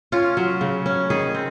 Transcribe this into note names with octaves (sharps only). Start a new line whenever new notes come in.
C#4 F4
F#3
C#3
C#4
D#3 G#4
C4